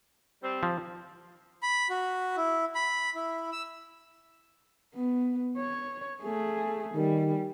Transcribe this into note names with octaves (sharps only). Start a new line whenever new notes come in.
G3 C4
F3
B5
F#4
E4
B5
E4
E6
B3
C#5
A3 G#4
D#3 G3